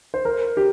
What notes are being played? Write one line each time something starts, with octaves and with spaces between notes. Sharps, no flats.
C5
A#4
G4